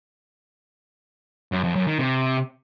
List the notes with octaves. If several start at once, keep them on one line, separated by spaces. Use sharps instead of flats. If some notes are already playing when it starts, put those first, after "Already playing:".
F#2
F2
F#2
D#3
C3